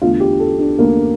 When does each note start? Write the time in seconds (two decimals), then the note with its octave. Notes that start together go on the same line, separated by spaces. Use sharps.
0.02 E2 D3 A3 F4
0.20 G4
0.40 A4
0.59 D4
0.78 E2 D3 A3 A#3